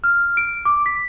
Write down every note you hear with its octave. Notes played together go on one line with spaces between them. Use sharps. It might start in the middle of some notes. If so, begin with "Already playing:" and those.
F6
D7
D6
B6